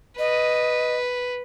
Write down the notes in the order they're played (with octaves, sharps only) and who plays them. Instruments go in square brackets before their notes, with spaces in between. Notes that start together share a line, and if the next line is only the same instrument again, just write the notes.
[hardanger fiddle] B4 [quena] D#5